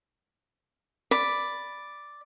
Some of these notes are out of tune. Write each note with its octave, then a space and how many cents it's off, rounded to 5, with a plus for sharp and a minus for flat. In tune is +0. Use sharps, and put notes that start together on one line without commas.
D5 +0 B5 +0